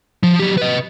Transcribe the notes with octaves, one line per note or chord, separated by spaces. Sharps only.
F3
F#3 G4
B4 D#5